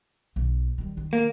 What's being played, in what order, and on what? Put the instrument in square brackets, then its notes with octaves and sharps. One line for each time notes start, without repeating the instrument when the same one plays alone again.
[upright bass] B1
D#3 G3
D#3
[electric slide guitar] A#3